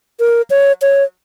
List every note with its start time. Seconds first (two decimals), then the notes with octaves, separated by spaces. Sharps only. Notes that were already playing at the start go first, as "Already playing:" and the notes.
0.20 A#4
0.50 C#5
0.82 C#5